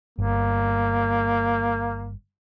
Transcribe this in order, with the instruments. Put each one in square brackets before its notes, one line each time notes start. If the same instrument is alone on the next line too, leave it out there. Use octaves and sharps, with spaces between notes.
[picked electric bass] G1 [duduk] A#3